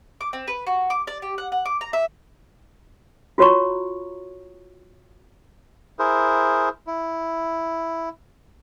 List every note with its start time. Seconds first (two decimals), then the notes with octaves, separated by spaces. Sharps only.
0.21 D6
0.33 C4
0.48 B4
0.67 F#4
0.90 D6
1.07 D5
1.22 G4
1.38 F#5
1.52 F#5
1.66 D6
1.81 A#5
1.93 E5
3.38 F4 F#4 C#5 A#5 C#6
5.99 E4 G#4 A#4 C5
6.87 E4